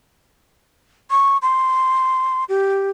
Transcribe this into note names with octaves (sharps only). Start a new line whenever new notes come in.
C#6
C6
G4